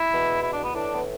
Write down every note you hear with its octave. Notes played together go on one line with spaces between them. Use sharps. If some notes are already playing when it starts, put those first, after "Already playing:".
Already playing: E4
E2 B2
E4
D4
B3
A2 E3 D4
B3